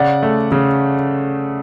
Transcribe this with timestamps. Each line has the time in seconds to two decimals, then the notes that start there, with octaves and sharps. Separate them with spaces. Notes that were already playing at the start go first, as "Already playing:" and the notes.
Already playing: C#3 D5 F#5
0.23 A3
0.52 C#3